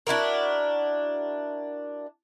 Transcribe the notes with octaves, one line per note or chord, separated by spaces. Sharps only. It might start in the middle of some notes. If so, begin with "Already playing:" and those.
D4 E4 F#4 A#4